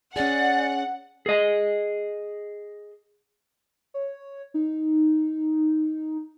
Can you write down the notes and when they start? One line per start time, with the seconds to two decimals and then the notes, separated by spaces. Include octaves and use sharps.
0.16 C#4 G#4 D5 F#5
1.26 G#4 D#5
3.94 C#5
4.54 D#4